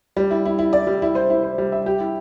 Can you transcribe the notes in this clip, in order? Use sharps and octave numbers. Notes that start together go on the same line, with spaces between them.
G3
E4
E4
E4
D5
G3
E4
C5
E4
C5
G3
E5
G4
E4